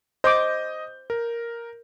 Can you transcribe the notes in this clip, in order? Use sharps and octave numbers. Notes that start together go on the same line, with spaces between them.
C5 D#5 D6 D#6 G6
A#4